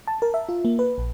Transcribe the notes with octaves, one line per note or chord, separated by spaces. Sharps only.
A5
A#4
E5
F4
A#3
B4
A#1